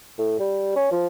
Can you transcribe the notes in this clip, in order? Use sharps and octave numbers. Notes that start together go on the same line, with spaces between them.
A2
G3
C#4
F3